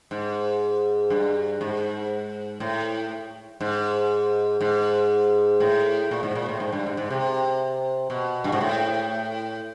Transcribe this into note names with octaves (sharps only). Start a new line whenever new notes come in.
G#2
G2
G#2
A2
G#2
G#2
A2
A#2
G#2
A#2
A2
G#2
G2
G#2
G#2
C3
B2
G2
G#2
A2